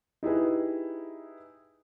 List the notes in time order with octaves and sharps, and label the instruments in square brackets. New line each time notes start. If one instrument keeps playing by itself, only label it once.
[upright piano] D#4 E4 G4 G#4 B4